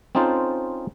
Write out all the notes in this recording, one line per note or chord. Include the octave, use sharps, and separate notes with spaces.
C4 C#4 D#4 F4 A4 C5